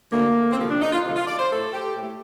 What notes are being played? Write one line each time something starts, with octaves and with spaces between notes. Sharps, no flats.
D2 D3 A3 A#3
C4
D2 C3 F3 A3 A#3
D4
D#4
F4
D2 C3 F3 A3 F4
F4
D5
C5
A2 A3 A4
G4
A2 A3